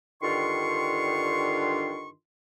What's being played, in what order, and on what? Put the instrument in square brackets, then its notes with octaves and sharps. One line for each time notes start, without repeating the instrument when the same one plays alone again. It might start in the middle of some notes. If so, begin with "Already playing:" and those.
[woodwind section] G2 D3 D#3 F4 C6 C#6